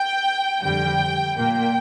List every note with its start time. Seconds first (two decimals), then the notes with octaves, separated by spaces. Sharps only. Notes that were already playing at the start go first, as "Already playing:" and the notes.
Already playing: G5
0.62 F2 D3 G3 G5
1.37 A#2 A#3 G5